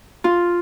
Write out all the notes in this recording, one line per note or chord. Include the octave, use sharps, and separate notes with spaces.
F4